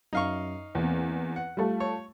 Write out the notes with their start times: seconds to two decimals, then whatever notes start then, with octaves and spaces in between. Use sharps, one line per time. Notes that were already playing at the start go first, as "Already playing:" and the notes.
0.13 F#2 C#4 D#4 F5 C#6
0.75 E2 A#3 C4
1.36 F#5
1.57 G3 A3 F4 F5 A5
1.80 C#5